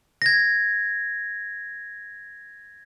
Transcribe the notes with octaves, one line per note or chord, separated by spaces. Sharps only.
G#6 A#6